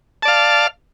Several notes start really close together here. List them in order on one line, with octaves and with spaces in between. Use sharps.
A5 D5 F5